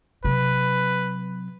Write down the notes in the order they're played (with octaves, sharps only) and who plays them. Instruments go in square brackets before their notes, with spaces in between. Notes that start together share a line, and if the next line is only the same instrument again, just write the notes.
[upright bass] C3 F#3 [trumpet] B4